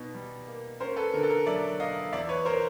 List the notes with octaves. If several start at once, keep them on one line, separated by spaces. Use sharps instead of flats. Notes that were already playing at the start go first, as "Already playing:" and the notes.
Already playing: B2 D#4
G3
A#3
C#4 A#4 C5
A4 B4
D3 A#4
A4
A#4
F#3 D5 E5
A#3 D#5 F5
E2 D5 E5
B4 C#5
A#4 C5